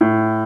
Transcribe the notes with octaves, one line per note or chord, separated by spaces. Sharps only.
A2